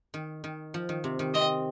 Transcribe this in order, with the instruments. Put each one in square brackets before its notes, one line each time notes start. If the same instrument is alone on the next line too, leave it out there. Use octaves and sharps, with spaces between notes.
[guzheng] D#3
D#3
F3
D#3
C3
D#3
[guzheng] C4 [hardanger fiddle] D#5